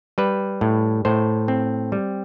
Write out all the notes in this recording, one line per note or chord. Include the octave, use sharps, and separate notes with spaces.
G3 B4
A2
A2 C5
C4
G3